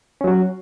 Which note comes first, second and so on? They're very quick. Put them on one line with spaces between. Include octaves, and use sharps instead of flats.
C#4 F#3 F#4